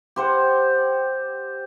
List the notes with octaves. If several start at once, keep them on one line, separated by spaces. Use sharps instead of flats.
G4 C5 F#5